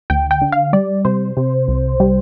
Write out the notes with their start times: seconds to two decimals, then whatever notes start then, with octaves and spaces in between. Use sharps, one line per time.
0.10 D2 G5
0.31 G5
0.41 D3
0.52 F5
0.73 G3 D5
1.05 C3 C5
1.37 C3
1.68 C2
2.00 G3